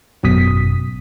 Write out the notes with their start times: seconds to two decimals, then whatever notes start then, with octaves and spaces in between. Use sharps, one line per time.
0.23 G#1 F#2 B2 D#6 B6